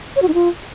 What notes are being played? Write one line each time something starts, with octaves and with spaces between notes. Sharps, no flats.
C#5
F#4
D#4
F4